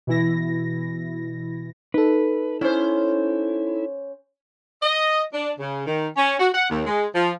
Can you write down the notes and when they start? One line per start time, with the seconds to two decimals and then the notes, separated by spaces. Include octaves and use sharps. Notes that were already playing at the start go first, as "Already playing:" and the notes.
0.07 B2 E3 E4 A#6
1.94 D#4 A4 B4
2.61 C#4 E4 C5
4.83 D#5
5.34 D4
5.59 C#3
5.87 D#3
6.17 C#4
6.40 F#4
6.54 F#5
6.70 D#2
6.87 G#3
7.14 F3